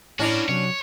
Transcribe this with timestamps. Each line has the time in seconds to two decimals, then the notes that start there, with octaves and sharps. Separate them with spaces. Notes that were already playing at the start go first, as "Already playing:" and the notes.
0.19 A2 C#4 D4 E4 F#4 A#4 D5
0.49 C3 F#3 C#5